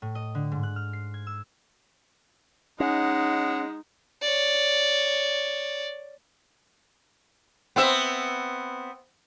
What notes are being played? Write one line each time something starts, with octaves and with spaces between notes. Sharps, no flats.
A2
D#5
D3
G#2
F#6
F6
C7
G#6
E6
G#3 C#4 D#4 F#5
C#5 D5
B3 C4 E5